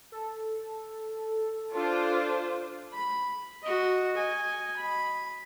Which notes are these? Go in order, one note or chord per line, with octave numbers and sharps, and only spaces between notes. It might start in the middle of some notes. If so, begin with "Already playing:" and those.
A4
D4 F4 A4 C5
B5
F#4 D#5
D#5 G#5
B5